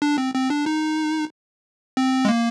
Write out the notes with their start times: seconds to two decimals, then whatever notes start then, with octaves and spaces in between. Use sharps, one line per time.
0.02 D4
0.18 C4
0.34 C4
0.50 D4
0.66 D#4
1.97 C4
2.25 G#3
2.29 A#3